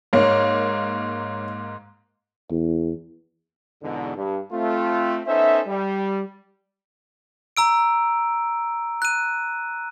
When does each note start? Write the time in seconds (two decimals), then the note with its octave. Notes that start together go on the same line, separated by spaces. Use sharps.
0.13 G#2 A#3 C#5
2.50 E2
3.83 E2 G#2 B2 D3
4.16 G2
4.52 A3 C4 F4
5.27 B3 C#4 D#4 A4 C5 E5
5.68 G3
7.57 A#5 E6 D7
9.02 F#6 D#7